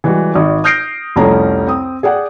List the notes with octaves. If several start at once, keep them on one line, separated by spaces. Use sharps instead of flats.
E3 G3 G#3 F#4
G#1 D5
D#6 F6 G6 A#6 C7 D7
C2 F2 G3 A3 C#4 A#5
C4 D#6
G#4 D5 F#5 G5